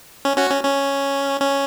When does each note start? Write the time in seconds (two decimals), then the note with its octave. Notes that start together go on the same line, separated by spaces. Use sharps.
0.25 C#4
0.37 C#4 F#4
0.50 C#4
0.64 C#4
1.41 C#4